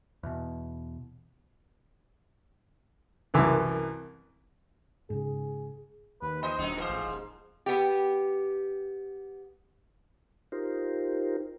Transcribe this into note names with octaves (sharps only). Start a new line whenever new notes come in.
E2 B2
C2 F#2 E3 D6
G#2 C#3 G#4
D#2 B4
E3 C5 D#5
D#1 F#2 F#3 D#4
G#2 F3 A#4 C5
A1
D#1
B3 G4
D#4 F4 G4 A#4 C5